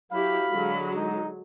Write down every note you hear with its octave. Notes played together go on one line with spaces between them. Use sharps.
F#3 E4 G4 F5 B5
D3 F#3 G#3
D#4